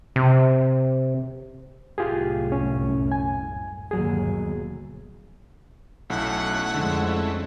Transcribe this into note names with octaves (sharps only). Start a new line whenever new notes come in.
C3
C2 F#2 A2 F4 G4 G#4
C#4
G#5
G1 D#2 B2 F#3 G#4
B1 A3 C#4 E4 F#5
F2 D3 G#3